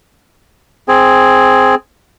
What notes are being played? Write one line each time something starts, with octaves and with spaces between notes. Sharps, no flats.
C4 G#4